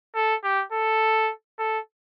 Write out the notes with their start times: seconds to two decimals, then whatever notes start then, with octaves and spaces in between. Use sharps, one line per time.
0.15 A4
0.44 G4
0.72 A4
1.59 A4